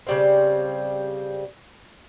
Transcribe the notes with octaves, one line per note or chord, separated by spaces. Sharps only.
C#3 G3 C4